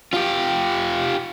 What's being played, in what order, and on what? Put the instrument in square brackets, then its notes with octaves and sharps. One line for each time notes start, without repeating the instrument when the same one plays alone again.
[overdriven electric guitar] F4 G4